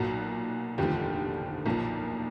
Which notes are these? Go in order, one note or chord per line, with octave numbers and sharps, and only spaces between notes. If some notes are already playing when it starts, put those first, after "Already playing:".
Already playing: B1 A#2 F#3 A#3 F#4
F1 D#2 D3 F3 G4
B1 A#2 F3 A#3